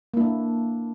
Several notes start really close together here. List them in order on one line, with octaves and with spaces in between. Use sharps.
A#3 E4 D4